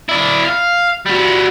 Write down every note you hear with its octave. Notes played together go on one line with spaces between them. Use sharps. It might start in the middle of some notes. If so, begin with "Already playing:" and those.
E4 D5
F5
G3 F#4